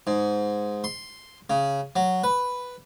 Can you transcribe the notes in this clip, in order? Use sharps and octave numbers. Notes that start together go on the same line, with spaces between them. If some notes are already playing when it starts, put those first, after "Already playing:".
G#2
C6
C#3
F#3
B4